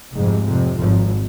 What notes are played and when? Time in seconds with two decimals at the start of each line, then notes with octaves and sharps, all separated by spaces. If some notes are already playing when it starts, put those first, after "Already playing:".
0.13 F1 F2 G#2 C3 G#3
0.45 F1 F2 C3
0.76 G#1 F2 G#2 F3